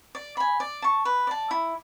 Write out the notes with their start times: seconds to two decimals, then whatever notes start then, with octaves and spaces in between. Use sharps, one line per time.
0.15 D5
0.37 G#5 B5
0.60 D5
0.82 A5 C#6
1.05 B4
1.27 D5 A5
1.51 E4